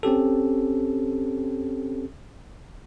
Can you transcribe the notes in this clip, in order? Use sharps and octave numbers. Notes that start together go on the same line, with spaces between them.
C4 C#4 G4 A4